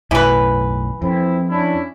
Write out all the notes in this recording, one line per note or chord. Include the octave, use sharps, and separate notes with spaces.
B1 F#2 A2 E3 B4
F2 C4 E4
C#4 D4 E4